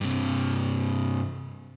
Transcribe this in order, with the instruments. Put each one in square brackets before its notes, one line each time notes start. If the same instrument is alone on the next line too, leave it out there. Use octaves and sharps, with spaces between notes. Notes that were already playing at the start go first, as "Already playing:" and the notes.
[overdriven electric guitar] G2 C3